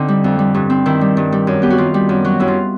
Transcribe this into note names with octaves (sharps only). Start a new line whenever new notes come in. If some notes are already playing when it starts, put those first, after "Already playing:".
Already playing: D3 C4 D#4
G3
F2
G3
G2
C4
D#3 E4
G3
G2
G3
F#2
B3 G4
F#4
D#3 F4
G3
F#2
F#3 F#4
F#2 E4
F4